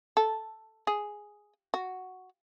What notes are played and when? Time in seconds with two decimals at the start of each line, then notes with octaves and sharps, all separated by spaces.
0.17 A4
0.87 G#4
1.74 F#4